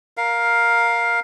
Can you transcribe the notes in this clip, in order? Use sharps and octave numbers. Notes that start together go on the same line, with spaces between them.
A#4 F5